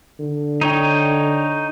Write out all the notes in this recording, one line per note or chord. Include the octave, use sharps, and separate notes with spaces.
D3
D#4 C#5 G5